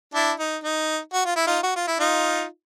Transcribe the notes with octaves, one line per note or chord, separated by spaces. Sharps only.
D4 E4
D#4
D#4
F#4
F4
E4
D#4 F4
F#4
F4
E4
D#4 F4